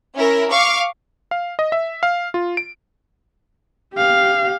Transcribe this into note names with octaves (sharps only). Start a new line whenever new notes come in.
C#4 E4 A#4
F5 C#6 D6
F5
D#5
E5
F5
F4
D7
G4 F5